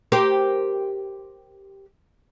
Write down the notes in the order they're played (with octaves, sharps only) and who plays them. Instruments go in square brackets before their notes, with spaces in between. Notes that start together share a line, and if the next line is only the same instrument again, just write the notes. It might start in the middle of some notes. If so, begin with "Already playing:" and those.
[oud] G4 A#4 C5